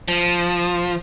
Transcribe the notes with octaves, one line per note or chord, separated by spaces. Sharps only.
F3